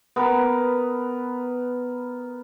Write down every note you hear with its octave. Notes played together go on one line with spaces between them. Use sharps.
B3 A#4 B4